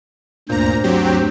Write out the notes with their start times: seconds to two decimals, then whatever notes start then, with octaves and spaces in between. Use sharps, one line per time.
0.49 D2 G2 A#2 C5 A#5
0.84 F#3 C4 G4